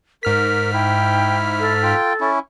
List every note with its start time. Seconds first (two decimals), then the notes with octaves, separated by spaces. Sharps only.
0.23 G#2 A#4 F6 B6
0.73 E4 G5
1.59 A4
1.83 F4 G5
2.20 C#4 E4